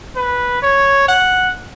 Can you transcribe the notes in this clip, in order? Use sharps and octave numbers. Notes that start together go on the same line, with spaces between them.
B4
C#5
F#5